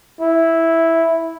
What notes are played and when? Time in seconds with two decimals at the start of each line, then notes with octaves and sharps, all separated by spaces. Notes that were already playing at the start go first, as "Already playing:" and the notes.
0.21 E4